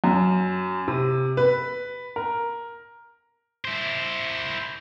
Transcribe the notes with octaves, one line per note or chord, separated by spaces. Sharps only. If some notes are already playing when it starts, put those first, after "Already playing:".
F#2
C3
B4
A#4
E4 C5